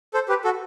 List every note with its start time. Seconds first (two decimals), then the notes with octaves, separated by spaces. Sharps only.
0.14 A4 C5
0.29 G4 B4
0.44 F#4 A4